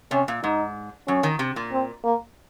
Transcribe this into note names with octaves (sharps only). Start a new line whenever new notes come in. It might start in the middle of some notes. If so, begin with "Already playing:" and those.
C3 C#4
A#2
G#2 D#4
F#2 C#4
D#3
C3
A#2
C4
A#3